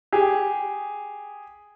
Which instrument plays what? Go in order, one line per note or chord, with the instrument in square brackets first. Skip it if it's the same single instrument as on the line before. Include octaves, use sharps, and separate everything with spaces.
[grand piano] G4 G#4